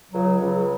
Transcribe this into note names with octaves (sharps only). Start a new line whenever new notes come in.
C#2 C#3 F#3
C#2 C#3 F#3